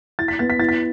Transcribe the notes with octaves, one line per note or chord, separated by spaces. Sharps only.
E4 A6
B6
B3 A6
B6
E4 A6
B6